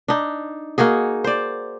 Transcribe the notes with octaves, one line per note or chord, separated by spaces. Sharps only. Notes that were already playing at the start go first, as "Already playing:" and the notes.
D4 D#4
A#3 D#4 F#4 G#4
C5 D5